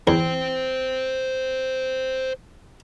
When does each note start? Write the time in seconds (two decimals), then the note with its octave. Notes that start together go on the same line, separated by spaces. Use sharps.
0.07 E2 C5 G5